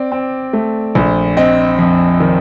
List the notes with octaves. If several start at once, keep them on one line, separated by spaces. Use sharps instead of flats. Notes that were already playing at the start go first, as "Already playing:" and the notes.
Already playing: C4 D5
C4
A3
A#1
C4 D#5
F2
D#3